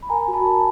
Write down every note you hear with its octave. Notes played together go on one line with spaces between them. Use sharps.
B5
A#4 G#5 A#5
F#4
A5 B5
A#4